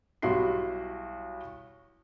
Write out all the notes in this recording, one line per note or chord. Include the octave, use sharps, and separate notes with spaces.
B1 G3 E4 F#4 C6 C7